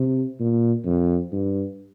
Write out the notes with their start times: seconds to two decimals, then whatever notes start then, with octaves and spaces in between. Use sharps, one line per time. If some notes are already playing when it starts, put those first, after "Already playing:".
Already playing: C3
0.40 A#2
0.85 F2
1.32 G2